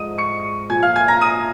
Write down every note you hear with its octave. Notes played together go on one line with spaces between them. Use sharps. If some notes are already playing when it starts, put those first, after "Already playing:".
Already playing: G#2 F3 D#5 D#6 D#7
C#6 C#7
A#2 F3 G#5 G#6
F5 F6
G#5 G#6
A#5 A#6
D#6 D#7